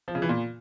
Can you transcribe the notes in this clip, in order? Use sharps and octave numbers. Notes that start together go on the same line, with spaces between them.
F3
C#3
E3
A#2